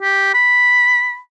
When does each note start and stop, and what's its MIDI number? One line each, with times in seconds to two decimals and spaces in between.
0.02 0.33 67
0.34 1.18 83